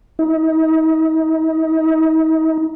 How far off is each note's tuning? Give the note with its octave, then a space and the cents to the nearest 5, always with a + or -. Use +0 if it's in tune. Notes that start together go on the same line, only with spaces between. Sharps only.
D#4 +40